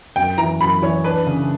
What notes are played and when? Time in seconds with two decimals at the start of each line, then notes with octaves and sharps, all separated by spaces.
0.16 F#2 G5
0.38 E3 A#5
0.60 F#2 B5
0.82 E3 C#5
1.04 D4 B4
1.27 C#3